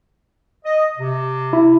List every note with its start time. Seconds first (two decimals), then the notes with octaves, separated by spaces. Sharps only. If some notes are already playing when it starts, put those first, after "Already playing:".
0.65 D#5
0.97 C3
1.53 E4